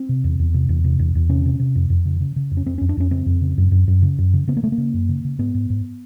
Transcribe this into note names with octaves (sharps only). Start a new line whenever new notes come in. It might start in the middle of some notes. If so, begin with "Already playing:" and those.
Already playing: C4
C3
E2
E2
C3
E2
C3
E2
E2
C3 C#4
C3
C3
F2
F2
C#3
C#3
C#3
F2
C#4
F2 C4
F2 C#4
D4
F2 C#4
C#3 C4
F2
C#3
F#2
F#2
F#2
C#3
F#2
C#3
C#3 B3
A#3
C#3 A3
A#3
C#3
F#2
C#3
C#3
G#2 B3
G#2
G#2